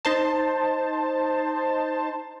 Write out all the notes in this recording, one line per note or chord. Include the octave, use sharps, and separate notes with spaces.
D#4 C5 A5